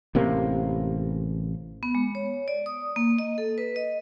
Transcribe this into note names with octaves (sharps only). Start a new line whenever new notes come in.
A1 C3 A#3
B3
G#3
C#5
D5
D#6
A#3
D#5
A4
B4
D#5